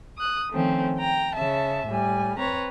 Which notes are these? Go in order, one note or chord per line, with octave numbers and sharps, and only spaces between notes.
D#6 F#6
D#3 F3 A3 C4 C#4
G5 A#5
C#3 E5 A5
A2 G3 G#5
C4 B4 C#5 A#5